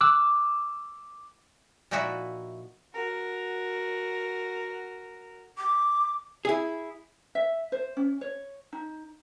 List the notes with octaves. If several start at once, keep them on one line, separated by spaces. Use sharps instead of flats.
D6 E6 F#6
A#2 F3 D#4 E4 F#4 E5
F#4 A#4
D6
E4 G#4
E5
C5
C#4
C#5
D#4